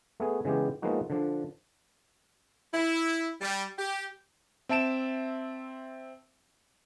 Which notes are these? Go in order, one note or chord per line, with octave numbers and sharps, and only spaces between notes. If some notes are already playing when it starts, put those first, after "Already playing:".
A3 B3 G#4
C#3 E3 G#3 B3 G4
F3 G#3 A#3 B3 D#4 F#4
D3 F3 D4
E4
G3
G4
C4 E5 A5 D7 E7